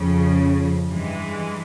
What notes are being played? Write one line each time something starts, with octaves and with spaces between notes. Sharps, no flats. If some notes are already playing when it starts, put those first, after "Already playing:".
Already playing: F2 C#3 F3
G2 E3 G#3